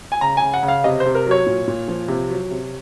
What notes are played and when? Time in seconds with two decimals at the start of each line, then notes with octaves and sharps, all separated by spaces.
0.12 G#5
0.21 C#3 A#5
0.37 G#5
0.42 C#3
0.54 F#5
0.63 C#3
0.68 F5
0.84 C3 D#5
1.00 C5
1.06 C3
1.15 A#4
1.26 F#3 C#5
1.46 A#2
1.68 A#2
1.88 F3
2.08 C3
2.30 F#3
2.51 C3